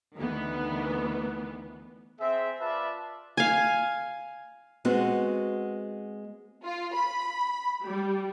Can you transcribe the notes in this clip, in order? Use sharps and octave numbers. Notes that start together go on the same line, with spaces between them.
D2 D#3 E3 B3
C4 G#4 E5
F4 B4 D5 E5 A5
F5 G#5
G#3 B3 C4 F#4
F4
B5
G3